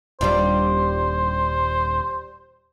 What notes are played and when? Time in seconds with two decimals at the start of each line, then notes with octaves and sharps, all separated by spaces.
0.21 D#1 G3 D4 F4 C5